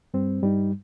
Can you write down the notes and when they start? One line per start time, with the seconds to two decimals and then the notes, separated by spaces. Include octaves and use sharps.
0.14 G2 G3 C4
0.43 G2 G3 D#4